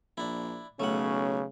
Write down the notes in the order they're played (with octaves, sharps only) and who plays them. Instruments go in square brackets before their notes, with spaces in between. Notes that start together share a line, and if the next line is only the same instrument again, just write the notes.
[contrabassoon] A#1 [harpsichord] D4 E4
[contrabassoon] B1 [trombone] C#3 [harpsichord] A3 F#5 [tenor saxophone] C#4